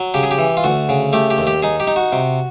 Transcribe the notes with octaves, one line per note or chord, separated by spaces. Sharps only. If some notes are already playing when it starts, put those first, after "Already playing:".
Already playing: F#3
C#3 G4
G#4
G4
E3
F4
D2 F#4
C#3
A3 G4
G4
D#2
G4
D#4 G#4
G4
D#4
F#4
C3